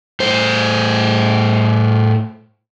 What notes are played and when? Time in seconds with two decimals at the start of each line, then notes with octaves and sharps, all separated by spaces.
0.20 A2 C5